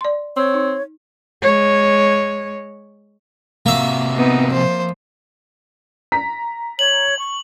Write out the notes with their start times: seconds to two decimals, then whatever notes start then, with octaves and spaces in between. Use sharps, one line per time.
0.01 D5 C6
0.36 C4 C#5
0.54 D#4
1.42 G#3 C#5
3.66 C3 A#3 F#4 E5
4.16 B3 C4 D#4
4.52 F3 C5
6.12 A#5 B6
6.79 C#5 F#7
7.19 C#6